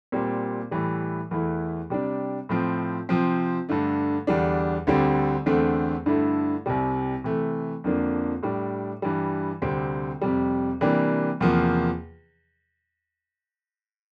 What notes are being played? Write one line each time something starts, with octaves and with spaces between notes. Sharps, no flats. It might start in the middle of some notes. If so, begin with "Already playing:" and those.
A#2 G3 C4
A2 E3 G3
E2 E3 A3 E4
C3 G3 D4
A2 F3 C4
C3 F3 C4
G2 D3 A3
E2 D3 G3 D4
D2 D3 G3 C4
E2 D3 A3 C4
G2 D3 A3 E4
C2 C3 G3
C3 E3 A3
F2 D3 F3 A#3 D4
A2 G3 D4
G2 E3 G3
D2 C3 G3 C4
F2 C3 G3
C3 E3 G3 A#3 D4
E2 C3 F3 A#3